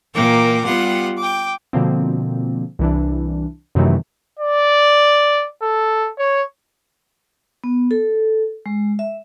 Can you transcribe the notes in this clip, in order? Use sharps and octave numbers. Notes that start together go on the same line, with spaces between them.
A#2 E3 A#3 A#4 G5 D6
G3 B3 F4 G4 F#5
G5 D6
B2 D3 F3 A#3 C4
C2 E3 D4
F#2 C3 D#3 E3 F#3 A3
D5
A4
C#5
B3
A4
G#3
E5